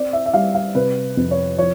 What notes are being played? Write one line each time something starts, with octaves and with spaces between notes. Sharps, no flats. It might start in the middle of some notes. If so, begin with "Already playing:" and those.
Already playing: C4 D5
E5
E5
G3 F5
F5
C3 B4
F2
C#5
F3 C#5